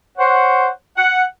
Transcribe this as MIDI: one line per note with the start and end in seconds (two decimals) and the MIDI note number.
0.18 0.68 72
0.18 0.68 73
0.18 0.68 78
0.97 1.23 78